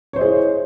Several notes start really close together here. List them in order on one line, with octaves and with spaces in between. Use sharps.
C#5 C5 D#5 G#4 E4